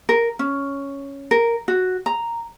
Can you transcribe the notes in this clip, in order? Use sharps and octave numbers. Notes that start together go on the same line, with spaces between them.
A#4
C#4
A#4
F#4
A#5